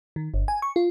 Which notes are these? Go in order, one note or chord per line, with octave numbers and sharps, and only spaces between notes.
D#3
G1
G#5
C#6
F4